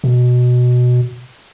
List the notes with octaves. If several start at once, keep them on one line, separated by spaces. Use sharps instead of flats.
B2